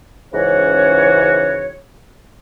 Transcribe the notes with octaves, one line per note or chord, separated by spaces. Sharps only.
C#2 G#2 C#3 E3 F#4 C#5